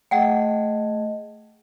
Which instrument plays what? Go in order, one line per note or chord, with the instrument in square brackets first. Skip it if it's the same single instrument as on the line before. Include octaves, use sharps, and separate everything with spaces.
[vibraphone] A3 G#4 D#5 [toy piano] F#5 G5